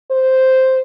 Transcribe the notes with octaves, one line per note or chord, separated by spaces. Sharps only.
C5